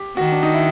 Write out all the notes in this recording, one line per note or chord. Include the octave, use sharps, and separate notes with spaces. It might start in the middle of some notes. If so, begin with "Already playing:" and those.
Already playing: G4
D#3 F#4
D4
D#4
E4